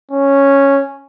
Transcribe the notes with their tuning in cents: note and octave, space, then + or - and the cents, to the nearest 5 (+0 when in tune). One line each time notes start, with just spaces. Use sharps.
C#4 -5